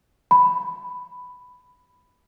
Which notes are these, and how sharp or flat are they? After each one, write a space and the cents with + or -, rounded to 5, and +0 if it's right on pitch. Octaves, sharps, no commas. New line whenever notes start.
B5 +10